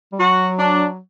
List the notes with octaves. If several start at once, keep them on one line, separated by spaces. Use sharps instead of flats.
G3
F#3 F#4
D4